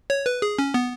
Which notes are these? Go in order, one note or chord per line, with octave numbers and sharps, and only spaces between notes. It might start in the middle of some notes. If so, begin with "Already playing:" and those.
C#5
B4
G#4
C#4
B3